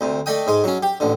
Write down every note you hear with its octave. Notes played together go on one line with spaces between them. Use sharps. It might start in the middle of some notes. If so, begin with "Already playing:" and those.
D2 C3
A3 D5 D#5 G5 D#6
G#2 G#3 D#6
F#3 C#4
G4
A1 D3